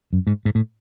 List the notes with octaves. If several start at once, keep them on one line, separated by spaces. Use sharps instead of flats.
F#2
G#2
G#2
A2